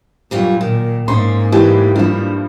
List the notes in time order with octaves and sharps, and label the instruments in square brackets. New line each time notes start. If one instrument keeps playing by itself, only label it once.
[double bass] G2 F#3 [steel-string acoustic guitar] A#2 G3 F4
[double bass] A#2 [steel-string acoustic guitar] D#3
[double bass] G#2 A#3 [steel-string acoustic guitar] C#4 [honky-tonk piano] C6
[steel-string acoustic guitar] A2 D3 G4 [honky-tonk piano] E3
[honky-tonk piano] G2 F3 [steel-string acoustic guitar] G3 E5